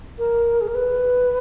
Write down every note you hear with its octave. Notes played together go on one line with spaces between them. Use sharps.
A#4
G#4
A#4
B4